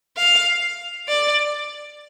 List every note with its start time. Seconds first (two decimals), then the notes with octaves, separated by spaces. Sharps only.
0.17 F5
1.08 D5